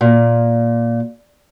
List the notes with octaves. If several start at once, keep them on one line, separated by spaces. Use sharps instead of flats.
A#2